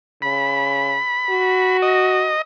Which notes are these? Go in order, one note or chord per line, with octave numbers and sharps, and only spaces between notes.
C#3 B5
F#4
D#5